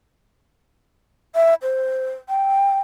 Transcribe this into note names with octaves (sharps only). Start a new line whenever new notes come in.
E5
C5
G5